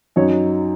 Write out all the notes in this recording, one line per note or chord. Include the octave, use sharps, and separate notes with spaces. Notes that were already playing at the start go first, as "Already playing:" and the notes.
F#2 F#3 D#4 C#5